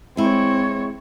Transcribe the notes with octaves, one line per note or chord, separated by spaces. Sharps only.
G#3 C4 E4 C#5